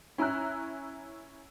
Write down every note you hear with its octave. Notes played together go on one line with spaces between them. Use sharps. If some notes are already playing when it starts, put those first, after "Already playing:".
C#4 E4 A#5 E6 F#6